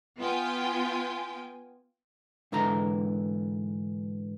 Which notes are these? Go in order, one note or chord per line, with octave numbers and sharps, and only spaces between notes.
B3 F4 G5 G#5
G#2 D3 E3 A#4 A#5